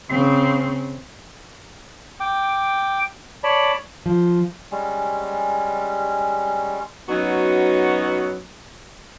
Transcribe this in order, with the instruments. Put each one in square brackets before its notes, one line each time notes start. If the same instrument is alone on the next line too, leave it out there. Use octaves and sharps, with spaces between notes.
[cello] C#3 C4
[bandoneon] G5 D6
C#5 D5 A5 B5
[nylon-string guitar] F3
[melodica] G3 G#3 C#4
[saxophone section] F#3 B3 C#4 D#4 F#4